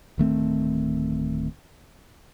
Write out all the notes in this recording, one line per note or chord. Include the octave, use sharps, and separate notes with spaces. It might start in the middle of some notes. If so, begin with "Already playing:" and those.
D1 D#3 A3 C4